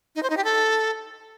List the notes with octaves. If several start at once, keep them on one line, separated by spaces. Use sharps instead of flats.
D#4
C5
D#4
G4
A4